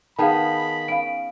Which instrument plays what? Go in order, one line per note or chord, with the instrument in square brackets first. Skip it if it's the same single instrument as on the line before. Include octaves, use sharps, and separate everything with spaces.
[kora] D#3 B3 G#4 [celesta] F5 A5 [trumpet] B5
[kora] C#4 [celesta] F5 D7